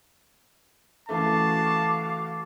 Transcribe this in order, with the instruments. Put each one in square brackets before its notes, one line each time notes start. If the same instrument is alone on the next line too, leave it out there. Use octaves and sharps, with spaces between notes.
[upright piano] C#3 E3 A3 [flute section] F#4 F5 D6 [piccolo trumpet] A5